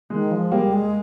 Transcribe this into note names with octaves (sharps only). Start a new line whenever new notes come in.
D#3 G#3
F3
G3 A#3
G#3